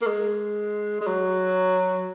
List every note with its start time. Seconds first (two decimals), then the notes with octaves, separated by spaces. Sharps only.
0.02 A#3
0.07 G#3
1.01 G#3
1.07 F#3